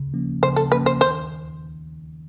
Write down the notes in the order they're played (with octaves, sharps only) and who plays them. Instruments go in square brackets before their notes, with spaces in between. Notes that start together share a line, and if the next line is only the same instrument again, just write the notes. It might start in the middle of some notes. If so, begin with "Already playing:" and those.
Already playing: [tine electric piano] C#3
F3 A#3 C#4
[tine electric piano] C#3 [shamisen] C5
[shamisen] A4
[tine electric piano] F3 A#3 C#4 [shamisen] B4
[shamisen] C5
[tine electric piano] D#3 [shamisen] C5